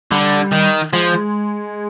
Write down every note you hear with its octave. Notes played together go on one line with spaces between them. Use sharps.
D3 G3
D#3
F3 G#3